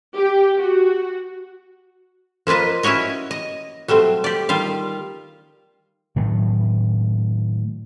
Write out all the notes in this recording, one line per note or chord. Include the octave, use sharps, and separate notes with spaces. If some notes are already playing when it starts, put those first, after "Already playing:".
G4
F#4
F3 A#3 F4 B4 D#5
C#4 E4 F#4 C#5 D#5
D#5
F#3 G3 A3 C4
G4 D5
D#3 G3 F4 F5
A2 D#3 F#3